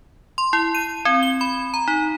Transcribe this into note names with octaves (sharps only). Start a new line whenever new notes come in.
C6
E4
D#7
C4
G7
B5
A#5
D#4